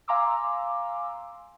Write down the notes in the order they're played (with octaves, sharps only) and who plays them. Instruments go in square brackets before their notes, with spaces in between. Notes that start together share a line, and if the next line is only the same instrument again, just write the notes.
[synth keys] F5 G#5 A#5 C6 D6 E6